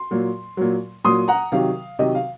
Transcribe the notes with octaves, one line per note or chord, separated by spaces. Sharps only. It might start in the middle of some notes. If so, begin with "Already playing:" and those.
Already playing: C6
A#2 F#3
A#2 F#3
A#2 F#3 C6 D#6
F#5 A#5
C3 D#3 F#3 F5
C3 D#3 F#3 D#5
F5